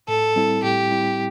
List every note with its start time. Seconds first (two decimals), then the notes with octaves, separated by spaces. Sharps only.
0.08 A2 A4
0.36 G3 C4 E4
0.63 A2 G4
0.91 G3 C4 E4